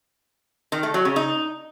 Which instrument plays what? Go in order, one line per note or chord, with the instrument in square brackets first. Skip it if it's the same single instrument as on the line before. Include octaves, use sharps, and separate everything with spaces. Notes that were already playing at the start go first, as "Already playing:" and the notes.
[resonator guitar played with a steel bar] D#3
A3
F#3
C#3
D#4